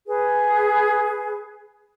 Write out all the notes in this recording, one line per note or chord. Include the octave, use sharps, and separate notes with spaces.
G#4 B4